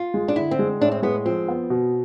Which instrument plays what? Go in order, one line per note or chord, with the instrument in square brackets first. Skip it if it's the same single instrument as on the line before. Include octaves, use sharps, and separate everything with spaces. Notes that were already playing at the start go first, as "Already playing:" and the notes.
Already playing: [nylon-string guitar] F4
[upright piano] G#3
[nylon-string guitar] D4
[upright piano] D3 [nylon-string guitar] E4
[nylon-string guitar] C4
[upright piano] G#3
[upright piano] A2 [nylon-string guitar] D4
[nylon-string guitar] C4
[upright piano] G#3 [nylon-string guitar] B3
[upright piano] F3 [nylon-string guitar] C4
[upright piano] B3
B2